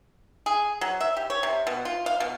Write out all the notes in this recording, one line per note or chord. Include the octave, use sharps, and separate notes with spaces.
G#4
F#3
E5
G4
C#5
C3
B2
F4
F5
B2